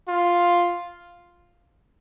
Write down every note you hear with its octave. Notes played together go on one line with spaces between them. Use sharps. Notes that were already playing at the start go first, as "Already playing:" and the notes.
F4